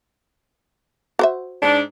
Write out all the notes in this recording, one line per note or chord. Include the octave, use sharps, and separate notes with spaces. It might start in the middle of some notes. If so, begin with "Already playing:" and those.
F#4 C5 E5
G#2 D4